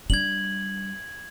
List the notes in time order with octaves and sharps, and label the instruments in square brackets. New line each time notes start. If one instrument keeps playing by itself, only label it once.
[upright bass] G3 D4 [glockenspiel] G#6 F#7